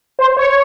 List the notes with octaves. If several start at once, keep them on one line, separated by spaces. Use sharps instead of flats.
C5
C#5